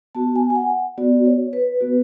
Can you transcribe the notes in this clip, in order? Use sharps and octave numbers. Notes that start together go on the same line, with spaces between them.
B3 F#4 A5
G#5
G#5
F#5
B3 F#4 D5
C#5
B4
B3 F#4